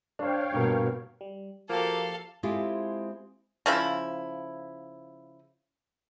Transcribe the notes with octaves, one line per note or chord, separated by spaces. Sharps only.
D4 C5 C#5 F5 G5
G2 B2 A#3
G3
F3 A#3 F#4 G4 A4 F5
G#3 C4 E4 F4 G4 A4
C#3 F3 E4